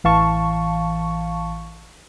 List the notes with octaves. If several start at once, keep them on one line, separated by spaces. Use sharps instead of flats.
A1 E3 F5 A5 C#6